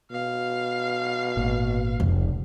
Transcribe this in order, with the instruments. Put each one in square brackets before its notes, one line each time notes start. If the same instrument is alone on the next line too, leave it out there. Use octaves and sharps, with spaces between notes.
[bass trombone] B2 [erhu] F5
[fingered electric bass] G#1 A#2
[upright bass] F1 [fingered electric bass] C#2